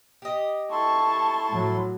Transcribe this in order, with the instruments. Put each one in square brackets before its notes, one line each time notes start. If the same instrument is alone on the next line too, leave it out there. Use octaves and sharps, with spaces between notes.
[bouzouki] G4 D#5
[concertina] E4 A4 C6 [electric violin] A5 C#6
[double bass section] A2 F#3